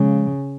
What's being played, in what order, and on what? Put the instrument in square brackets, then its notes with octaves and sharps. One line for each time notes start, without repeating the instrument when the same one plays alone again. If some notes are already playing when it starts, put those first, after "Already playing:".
Already playing: [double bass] C#3 [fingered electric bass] F3 G#3